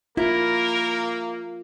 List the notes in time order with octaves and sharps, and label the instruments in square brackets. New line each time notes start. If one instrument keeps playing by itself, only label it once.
[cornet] A#3 [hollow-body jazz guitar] E4 [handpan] F4 [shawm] A#4